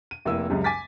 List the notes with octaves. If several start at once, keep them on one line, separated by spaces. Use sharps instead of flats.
D#7
F1 A#3 E4 E6
C#2 F#2 C#3 G3
G#5 D6 A6 B6